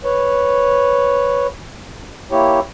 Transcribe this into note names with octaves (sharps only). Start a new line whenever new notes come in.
B4 C#5
A#3 E4 G4 C#5